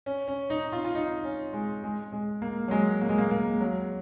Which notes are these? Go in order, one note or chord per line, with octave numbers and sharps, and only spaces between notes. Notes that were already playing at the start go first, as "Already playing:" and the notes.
C#4
C#4
D#4
F4
F4
D#4
C#4
G#3
G#3
G#3
A#3
F#3
G#3
A#3
G#3
A#3
A#3
F#3